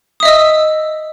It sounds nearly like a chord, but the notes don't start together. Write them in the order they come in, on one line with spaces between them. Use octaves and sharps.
D#6 E5 D#5 E6